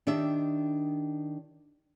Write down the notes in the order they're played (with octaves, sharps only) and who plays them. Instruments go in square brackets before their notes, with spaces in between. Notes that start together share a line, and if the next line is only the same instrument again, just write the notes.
[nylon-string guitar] D#3 D4 G4 E5